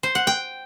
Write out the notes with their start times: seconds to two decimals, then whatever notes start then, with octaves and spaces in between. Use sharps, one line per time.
0.03 C5
0.15 F#5
0.27 G5